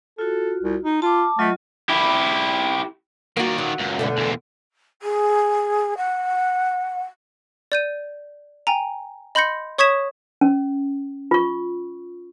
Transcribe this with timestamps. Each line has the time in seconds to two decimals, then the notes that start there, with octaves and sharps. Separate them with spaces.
0.19 F4 F#4 A4
0.63 C2
0.83 D#4
1.02 F4 A5 D6
1.39 F#3 A3 F4 D#5
1.90 E4 G4
3.37 D#3 A#3 F#4 D5
3.58 F#3
3.78 C#2 F#2
3.99 B2 D3 A3
4.17 E2 A#2
5.02 G#4
5.97 F#5
7.72 D5 G6 D#7
8.67 G5 G#5 A#5
9.35 D#5 B5 C6 G6 A#6 C#7
9.78 C#5 C#6 D#6 G#6 B6 E7
10.41 C#4
11.31 F4 C#6